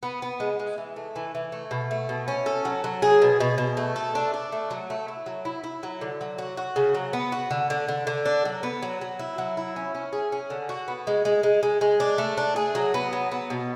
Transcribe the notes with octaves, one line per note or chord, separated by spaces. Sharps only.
B3
B3
G#3
G#3
E3
A3
E3
E3
A3
B2
A3
B2
C#4
A4
F#3
F#3
G#4
B2
B2
B2
A3
A4
D4
D4
A3
F#3
A3
E4
F#3
E4
E4
F#3
D3
F#3
F#4
F#4
C#3
F#3
B3
F#4
D3
D3
D3
D3
D4
F#3
B3
F#3
F#3
E4
F#3
E4
C#4
C#4
G#4
C#4
D3
F#4
B3
G#3
G#3
G#3
G#3
G#3
D4
A3
D4
G#4
F#3
B3
F#3
B3
B2